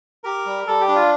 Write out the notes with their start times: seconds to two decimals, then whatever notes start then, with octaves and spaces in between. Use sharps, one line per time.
0.24 G4 A#4
0.46 G3
0.67 G3 A4
0.80 G4
0.88 D4
0.95 F4